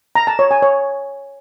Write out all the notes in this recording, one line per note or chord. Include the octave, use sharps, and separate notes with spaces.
A#5
A5
C#5
G#5
C#5